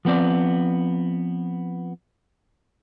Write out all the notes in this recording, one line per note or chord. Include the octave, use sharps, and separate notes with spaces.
F3 B3 C4 D5